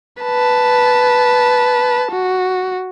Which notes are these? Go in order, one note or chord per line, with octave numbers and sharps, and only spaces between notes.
B4 A5
F#4